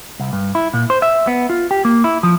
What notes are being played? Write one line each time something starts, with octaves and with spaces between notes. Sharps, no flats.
C2
G2
E4
A#2
C5
E5
B3
F4
G4
A#3
E4
F3